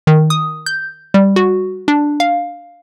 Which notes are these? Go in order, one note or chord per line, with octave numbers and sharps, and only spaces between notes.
D#3
D#6
G6
G3
F#4
D4
F5